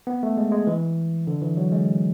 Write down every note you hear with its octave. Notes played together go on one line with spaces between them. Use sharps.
B3
A3
G#3
G#3
E3
D3
E3
F#3
G#3